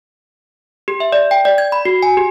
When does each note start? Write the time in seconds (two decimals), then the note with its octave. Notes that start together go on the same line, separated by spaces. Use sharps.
0.88 G4
1.00 E5
1.12 D5
1.31 G5
1.45 D5
1.58 G#6
1.72 B5
1.85 F#4
2.03 G#5
2.17 G4